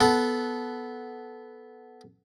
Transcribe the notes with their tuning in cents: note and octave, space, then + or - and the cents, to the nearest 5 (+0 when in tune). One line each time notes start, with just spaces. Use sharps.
B3 +0 A4 -10 F#5 +0